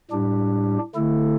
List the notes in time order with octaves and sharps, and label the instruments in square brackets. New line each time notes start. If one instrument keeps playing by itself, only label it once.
[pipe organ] A2 G3 D4 G4
D3 A3 E4 A4